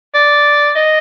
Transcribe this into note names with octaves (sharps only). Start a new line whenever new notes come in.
D5
D#5